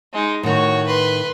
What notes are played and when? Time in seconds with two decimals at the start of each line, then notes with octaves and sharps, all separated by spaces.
0.13 G#3 D#4
0.43 A2 D#3 F#4 C#5
0.86 B4 C6